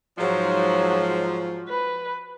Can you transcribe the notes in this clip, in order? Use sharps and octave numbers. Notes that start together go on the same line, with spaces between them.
G#2 F3 F#3
B4